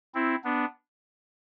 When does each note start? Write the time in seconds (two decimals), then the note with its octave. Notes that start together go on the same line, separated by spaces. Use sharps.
0.15 C4 E4
0.44 B3 D4